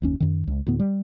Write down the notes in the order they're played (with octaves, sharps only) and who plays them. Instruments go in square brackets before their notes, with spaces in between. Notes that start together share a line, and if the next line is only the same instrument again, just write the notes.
[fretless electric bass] F#1 D#2 C#4
F#2 D#3
C#2
D2 A2 B3
G3